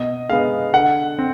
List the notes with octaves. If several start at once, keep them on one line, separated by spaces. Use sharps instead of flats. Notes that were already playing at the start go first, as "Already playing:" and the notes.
Already playing: B2 D#5
G#3 B3 F5
D3 F#5
C4